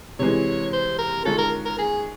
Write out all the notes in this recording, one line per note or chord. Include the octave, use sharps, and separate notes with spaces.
C3 E3 G#3 C#5
C5
A#4
D#3 G#3 C#4 F4 A4
A#4
A#4
G#4